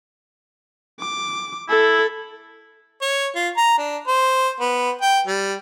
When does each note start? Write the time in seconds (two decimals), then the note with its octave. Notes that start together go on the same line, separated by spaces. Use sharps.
1.00 D6
1.69 E4 A4
3.02 C#5
3.35 F4
3.57 A#5
3.78 D4
4.07 C5
4.60 B3
5.02 G5
5.27 G3